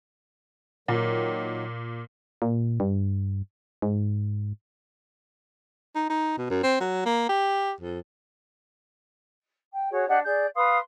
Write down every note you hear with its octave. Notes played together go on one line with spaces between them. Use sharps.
A#2 D#3 F#3
A#2
G2
G#2
D#4
D#4
B2
F#2
C4
F#3
A#3
G4
F2
G5
F#4 G#4 C#5
D4 G4 D#5 F#5
G#4 D5 G6
B4 F5 C6 D#6